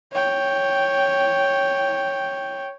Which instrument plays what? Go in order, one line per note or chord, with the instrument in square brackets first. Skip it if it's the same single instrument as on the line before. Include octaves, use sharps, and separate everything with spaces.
[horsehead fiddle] C#5 G5